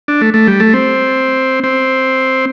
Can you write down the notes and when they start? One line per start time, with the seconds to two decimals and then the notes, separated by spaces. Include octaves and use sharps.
0.08 D4
0.21 A3
0.34 A3
0.48 G3
0.60 A3
0.74 C4
1.64 C4